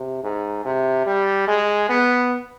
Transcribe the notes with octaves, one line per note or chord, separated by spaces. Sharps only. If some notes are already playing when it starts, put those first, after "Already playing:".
Already playing: C3
G#2
C3
G3
G#3
B3